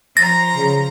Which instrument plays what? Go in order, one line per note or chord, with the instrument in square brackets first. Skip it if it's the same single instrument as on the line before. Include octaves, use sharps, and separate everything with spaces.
[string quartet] F3 A#5 [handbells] A6 A#6
[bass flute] C#3